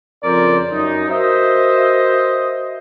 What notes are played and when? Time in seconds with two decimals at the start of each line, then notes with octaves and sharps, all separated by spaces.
0.23 F2 C#3 A#4 C5 D5
0.71 F#2 D#4
1.09 F#4 A#4 C5 D#5 E5